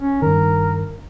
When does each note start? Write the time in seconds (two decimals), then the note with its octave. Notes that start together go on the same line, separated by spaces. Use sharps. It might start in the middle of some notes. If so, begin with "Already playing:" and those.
0.01 C#4
0.22 G2 D#3 A#4